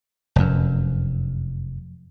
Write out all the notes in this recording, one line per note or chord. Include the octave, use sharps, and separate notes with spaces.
F1 F#2